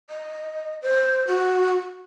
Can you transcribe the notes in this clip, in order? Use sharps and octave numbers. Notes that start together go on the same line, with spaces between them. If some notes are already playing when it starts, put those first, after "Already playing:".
D#5
C5
F#4